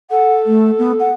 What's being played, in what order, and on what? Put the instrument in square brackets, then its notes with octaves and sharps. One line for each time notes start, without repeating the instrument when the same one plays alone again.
[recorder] A4 [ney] F#5
[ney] A3
B3
F#5